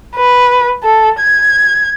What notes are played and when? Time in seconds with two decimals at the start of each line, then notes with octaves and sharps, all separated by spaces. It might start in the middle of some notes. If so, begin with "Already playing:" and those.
0.16 B4
0.84 A4
1.19 G#6